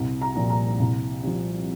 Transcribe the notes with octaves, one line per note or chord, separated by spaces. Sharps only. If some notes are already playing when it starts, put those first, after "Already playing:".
Already playing: C2
A#5
A#2 F3
A#5
C2
C3 F3